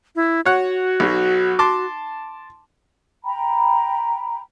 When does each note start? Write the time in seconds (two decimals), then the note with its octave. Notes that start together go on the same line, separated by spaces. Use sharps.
0.16 E4
0.45 F#4 C#5 F#5
1.00 B1 F#3
1.59 A5 C6 D6
3.24 G5 A#5 B5